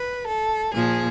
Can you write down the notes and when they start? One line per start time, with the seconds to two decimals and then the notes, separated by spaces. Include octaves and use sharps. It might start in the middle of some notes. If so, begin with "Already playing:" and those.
Already playing: B4
0.27 A4
0.73 A#2 F3 G#4